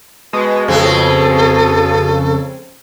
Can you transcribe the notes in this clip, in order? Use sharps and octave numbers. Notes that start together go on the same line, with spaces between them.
B2 G#3 B4
F2 C#3 G#3 C4 A4